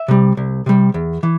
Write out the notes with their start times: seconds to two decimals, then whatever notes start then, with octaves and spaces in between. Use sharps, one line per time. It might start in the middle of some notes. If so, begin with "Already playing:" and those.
Already playing: E5
0.08 C3 G3
0.37 C2
0.66 C3 G3
0.94 E2
1.23 E3